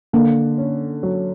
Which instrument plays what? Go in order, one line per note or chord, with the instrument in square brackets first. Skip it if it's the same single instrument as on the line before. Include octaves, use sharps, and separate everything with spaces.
[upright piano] D3 [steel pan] A#3
[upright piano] C#4
F#3